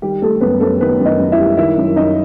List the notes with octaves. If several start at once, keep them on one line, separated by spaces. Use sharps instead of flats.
D#3 G3 G4
G3 A3 A4
F#2 B3 B4
F#2 A3 A4
D#3 B3 B4
F#2
D#4 D#5
F#2
E4 E5
G3
D#3 E4 E5
F#2
F#2 D#4 D#5